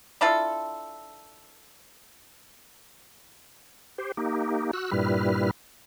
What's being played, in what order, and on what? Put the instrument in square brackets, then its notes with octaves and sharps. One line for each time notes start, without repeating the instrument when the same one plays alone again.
[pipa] D4 E4 F4 A4
[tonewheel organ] G4 C5
A#3 D#4 G4
F#4 E6 F#6
G2 A#2 G3 E4 B4 F6